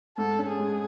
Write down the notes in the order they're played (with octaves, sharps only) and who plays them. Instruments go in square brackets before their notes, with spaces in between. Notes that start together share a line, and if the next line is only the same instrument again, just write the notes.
[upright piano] G#2 [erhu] A4
[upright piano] C#4
[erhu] G#4
[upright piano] G#3